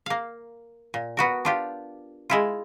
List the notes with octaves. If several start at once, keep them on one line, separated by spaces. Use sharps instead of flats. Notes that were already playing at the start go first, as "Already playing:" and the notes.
A#3 F5
A#2
B3 F#4 A#4
D4 F4 G4
G#3 E4 F4